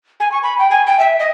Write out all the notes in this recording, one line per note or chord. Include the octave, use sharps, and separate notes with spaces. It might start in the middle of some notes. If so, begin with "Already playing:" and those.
G#5
C#6
B5
G5
G#5
G5
E5
D#5